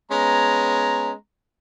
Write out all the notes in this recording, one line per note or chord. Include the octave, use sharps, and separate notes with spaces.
G#3 B3 C#4 A#5